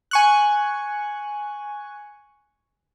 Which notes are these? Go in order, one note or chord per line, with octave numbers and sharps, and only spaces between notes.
G#5 C#6 F#6